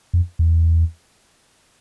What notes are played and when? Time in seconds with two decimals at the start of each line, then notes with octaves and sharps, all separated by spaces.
0.14 F2
0.39 E2